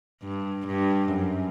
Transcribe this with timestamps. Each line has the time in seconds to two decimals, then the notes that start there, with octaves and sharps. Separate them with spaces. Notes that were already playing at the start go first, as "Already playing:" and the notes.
0.23 G2
0.67 G2
1.14 F#2